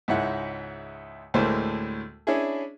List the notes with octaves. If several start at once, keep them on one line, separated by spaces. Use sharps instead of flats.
C#2 G#2 E4 F#5
D2 A2 G#3 A#3 C5
C#4 D4 E4 G#4